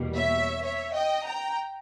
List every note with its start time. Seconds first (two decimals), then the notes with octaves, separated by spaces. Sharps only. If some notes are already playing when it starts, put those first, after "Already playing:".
Already playing: E2 B2 G3 A#3
0.14 C#5 E5
0.62 C#5 E5
0.94 D#5 G5
1.25 G5 A#5